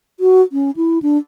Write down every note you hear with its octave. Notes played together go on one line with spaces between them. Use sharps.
F#4
C#4
E4
D4